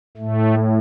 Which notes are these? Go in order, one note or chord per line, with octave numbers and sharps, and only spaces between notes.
A2 A3